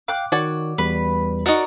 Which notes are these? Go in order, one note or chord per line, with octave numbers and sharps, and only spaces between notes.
F5 G5 D6 F#6
D#3 F#4 C#5 D5
E2 G3 B4
D#4 F#4 A#4 D5